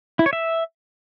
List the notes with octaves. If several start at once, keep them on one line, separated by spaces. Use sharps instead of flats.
E4
C#5
E5